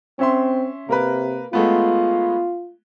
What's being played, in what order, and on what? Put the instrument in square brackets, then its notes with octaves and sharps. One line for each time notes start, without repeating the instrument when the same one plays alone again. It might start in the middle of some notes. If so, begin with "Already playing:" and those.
[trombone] C4 [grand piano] C#4 E5 C6
[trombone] C3 [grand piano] A#3 A#4 B4
[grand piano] G#3 A3 B3 [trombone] F4